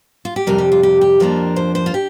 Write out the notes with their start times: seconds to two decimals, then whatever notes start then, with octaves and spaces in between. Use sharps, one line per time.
0.25 F4
0.36 G4
0.47 F2 C3 G3 A#4
0.58 G4
0.72 F4
0.83 G4
1.01 G4
1.20 F2 F3 A#3 D4 A#4
1.56 C5
1.75 C5
1.86 F4
1.94 G4